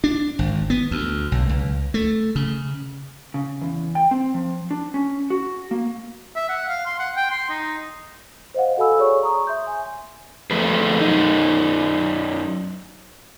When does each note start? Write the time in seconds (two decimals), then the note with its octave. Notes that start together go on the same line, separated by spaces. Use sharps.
0.04 D4
0.39 G#1
0.70 B3
0.91 D2
1.32 B1
1.49 C#2
1.94 A3
2.36 C#3
3.34 C#3
3.62 E2
3.95 G5
4.11 C4
4.34 F3
4.71 D4
4.94 C#4
5.30 F#4
5.71 A#3
6.36 E5
6.49 F#5
6.69 F5
6.86 C6
6.99 F#5
7.16 G5
7.31 C6
7.50 D#4
8.54 C5 D#5 F5 F#5
8.77 F#4 A4 F5 G#5 B5 E6
8.99 G#4 C#5 D5 C#6
9.23 A#5 C#6 D#6
9.47 E5 C6 G6
9.67 G#5
10.51 F2 A3 G#4 B4
11.01 F#2 D#4